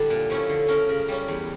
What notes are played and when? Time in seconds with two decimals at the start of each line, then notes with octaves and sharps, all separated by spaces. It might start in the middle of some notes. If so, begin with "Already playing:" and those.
Already playing: D3 G3 D4 E4
0.10 A#2
0.30 F3 A3 C#4 E4
0.49 D3
0.68 F3 C#4 A#4
0.89 C#3 A#4
1.08 G3 C#4
1.28 E2